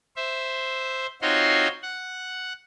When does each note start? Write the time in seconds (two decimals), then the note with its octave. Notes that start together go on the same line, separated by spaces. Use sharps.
0.16 C5 E5
1.22 C4 D#4 F4 F#4 C#5 C6
1.83 F#5